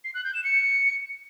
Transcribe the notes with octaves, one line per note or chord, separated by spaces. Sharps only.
C7
F#6
G6
E7
C#7